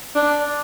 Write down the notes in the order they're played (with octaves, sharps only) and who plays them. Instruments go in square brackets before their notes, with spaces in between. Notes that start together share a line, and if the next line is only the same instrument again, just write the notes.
[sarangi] D4